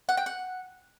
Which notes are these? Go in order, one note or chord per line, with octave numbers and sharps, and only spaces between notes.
F#5
G5
F#5